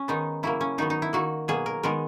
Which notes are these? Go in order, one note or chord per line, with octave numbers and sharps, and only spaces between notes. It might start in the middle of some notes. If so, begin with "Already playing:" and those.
Already playing: C#4
D#3 G#3 B3 D#4
C#3 F#3 A#3 E4
C#4
D#3 F#3 B3 D#4
D#4
E4
D#3 A#3 F#4
B2 F#3 A#3 G#4
A#4
D#3 G#3 B3 A#4